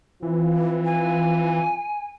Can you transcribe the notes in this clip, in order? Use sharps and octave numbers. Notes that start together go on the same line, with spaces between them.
E3 F3 C4 F4
G#5